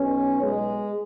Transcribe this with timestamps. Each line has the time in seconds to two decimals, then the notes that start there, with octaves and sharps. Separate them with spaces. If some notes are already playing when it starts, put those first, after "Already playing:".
Already playing: B1 B2 C#4
0.42 G#3